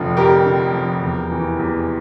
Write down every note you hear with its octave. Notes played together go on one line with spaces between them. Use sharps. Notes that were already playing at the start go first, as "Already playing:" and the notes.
Already playing: F1 D3 F3
F2 G4 A#4
D3
F3
E2
E3
E2